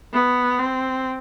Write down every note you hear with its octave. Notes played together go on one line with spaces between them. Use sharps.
B3
C4